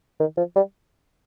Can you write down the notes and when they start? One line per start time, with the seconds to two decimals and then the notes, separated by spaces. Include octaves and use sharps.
0.20 D#3
0.37 F3
0.56 G3